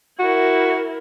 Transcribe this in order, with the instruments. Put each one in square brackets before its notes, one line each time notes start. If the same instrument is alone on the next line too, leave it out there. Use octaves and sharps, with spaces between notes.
[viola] E4 A#4 [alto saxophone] F#4